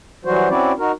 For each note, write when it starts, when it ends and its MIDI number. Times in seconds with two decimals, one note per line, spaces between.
0.25 0.49 52
0.25 0.49 54
0.25 0.49 55
0.25 0.49 66
0.25 0.49 72
0.50 0.72 60
0.50 0.72 61
0.50 0.72 64
0.50 0.72 66
0.50 0.72 74
0.79 0.92 63
0.79 0.92 66
0.79 0.92 70